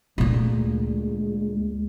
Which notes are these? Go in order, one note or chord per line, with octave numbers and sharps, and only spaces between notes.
D2 A#2 G#3